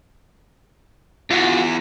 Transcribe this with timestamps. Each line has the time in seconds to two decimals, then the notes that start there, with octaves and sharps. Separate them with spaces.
1.31 E2 F4 F#4